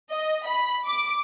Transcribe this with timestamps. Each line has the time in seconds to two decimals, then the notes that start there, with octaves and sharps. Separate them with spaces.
0.10 D#5
0.47 B5
0.86 D6